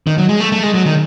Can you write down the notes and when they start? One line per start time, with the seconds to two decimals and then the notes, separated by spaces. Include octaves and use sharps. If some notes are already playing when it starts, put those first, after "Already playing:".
0.07 D#3
0.18 F#3
0.29 G#3
0.40 A3
0.52 A3
0.63 G#3
0.74 F#3
0.86 D#3